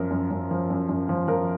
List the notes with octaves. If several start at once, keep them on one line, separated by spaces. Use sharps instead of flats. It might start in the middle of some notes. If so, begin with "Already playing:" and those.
Already playing: F#2 F3 A#4
F#2
F#2
F3
F#2
F#2
F3
F3 A#4